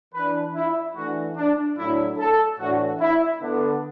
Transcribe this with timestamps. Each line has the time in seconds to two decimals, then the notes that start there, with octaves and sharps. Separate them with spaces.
0.14 E3 D4 B4
0.55 E4
0.96 E3 A3 D4 F#4
1.36 D4
1.77 A2 F#3 A3 D4 E4
2.18 A4
2.59 A2 E3 D4 F#4
3.00 E4
3.41 D3 B3 D4